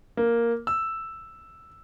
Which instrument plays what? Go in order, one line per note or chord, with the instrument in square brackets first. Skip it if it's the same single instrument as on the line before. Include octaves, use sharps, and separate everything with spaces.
[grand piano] A#3
E6